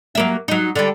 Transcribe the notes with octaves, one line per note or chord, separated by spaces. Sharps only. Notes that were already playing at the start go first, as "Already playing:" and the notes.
F#3 A#3 E5
F#3 D#4
D3 G3